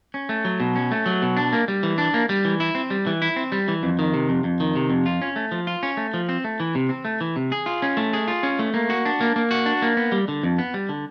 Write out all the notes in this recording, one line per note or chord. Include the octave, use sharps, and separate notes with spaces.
C#4
A3
F#3
B2
C#4
A3
F#3
B2
D4
A#3
G3
E3
D4
A#3
G3
E3
E4
C4
G3
E3
E4
C4
G3
E3
F2
D#3
C3
F2
F2
D#3
C3
F2
F4
C#4
A3
F3
F4
C#4
A3
F3
C4
A3
E3
C3
C4
A3
E3
C3
G#4
F4
C#4
A3
G#4
F4
C#4
A3
A#3
F#4
D4
A#3
A#3
F#4
D4
A#3
B3
G3
D3
F2
B3
G3
D3